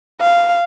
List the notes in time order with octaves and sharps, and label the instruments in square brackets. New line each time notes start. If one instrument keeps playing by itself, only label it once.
[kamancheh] F5